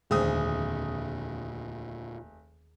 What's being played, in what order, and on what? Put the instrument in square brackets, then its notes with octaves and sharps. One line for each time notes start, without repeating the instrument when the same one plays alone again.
[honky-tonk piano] F1 D#6 [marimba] D#2 D#3 C5 [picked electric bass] A#2 D3 [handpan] G#4